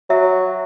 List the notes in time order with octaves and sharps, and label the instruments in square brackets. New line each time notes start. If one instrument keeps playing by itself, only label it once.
[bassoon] F#3 [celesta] E5